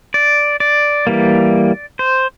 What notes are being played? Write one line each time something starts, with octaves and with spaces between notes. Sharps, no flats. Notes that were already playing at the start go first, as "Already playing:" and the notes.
D5
D5
E3 G3 A#3
C5